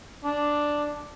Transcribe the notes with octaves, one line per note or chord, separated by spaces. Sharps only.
D4